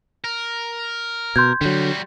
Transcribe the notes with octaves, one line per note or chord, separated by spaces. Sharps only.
A#4
B2 C6 G6 G#6
D3 F#3 G3 F#4